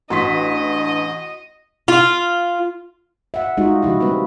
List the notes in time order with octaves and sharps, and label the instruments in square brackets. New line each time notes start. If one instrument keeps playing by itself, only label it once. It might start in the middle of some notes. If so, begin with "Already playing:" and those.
[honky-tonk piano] A1 [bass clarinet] D4 [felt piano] F#4 C6 B6 [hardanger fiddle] D#5
[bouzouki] F4
[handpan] E5 F#5
G3 G#3 D#4 F4 F#4
C#3 F3 E4 F#4
G3 A#3 C4 B4